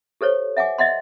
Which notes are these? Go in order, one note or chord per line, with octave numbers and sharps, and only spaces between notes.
G4 A4 C5 C#5
E5 F#5 G#5 D6
D#5 E5 F#5 C6